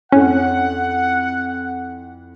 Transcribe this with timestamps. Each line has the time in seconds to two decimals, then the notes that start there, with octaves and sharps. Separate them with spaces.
0.12 F2 C#4 E4 F#5